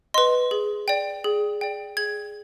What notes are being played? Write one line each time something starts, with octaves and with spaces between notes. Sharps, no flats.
B4 D#5 C6
G#4
D5 G5
G#4
D5 G5
G#4 G#6